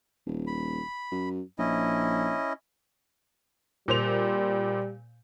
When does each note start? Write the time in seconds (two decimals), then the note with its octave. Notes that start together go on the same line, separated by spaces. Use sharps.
0.26 D#1
0.47 B5
1.12 F#2
1.59 A#1 C#4 E4 D#5
3.88 A#2 G3 C5 F7